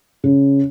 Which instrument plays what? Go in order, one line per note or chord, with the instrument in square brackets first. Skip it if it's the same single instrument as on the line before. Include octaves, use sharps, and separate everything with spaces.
[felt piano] C#3